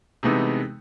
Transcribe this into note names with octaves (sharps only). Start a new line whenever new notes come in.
C3 E3 G#3 A3 B3 D#4